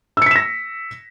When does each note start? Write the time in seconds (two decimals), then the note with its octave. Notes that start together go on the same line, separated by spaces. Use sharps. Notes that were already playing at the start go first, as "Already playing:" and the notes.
0.17 E6
0.22 C#7
0.26 B6
0.31 E7
0.36 A#6